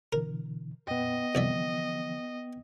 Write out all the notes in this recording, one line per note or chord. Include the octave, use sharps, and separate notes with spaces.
B2 D3 E3 A#4
F2 A#2 B3 D#5 G5
C2 D3 E3 F3 D5 E5